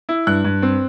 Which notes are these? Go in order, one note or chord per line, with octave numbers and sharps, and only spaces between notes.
E4
G2 F#6
G2
C4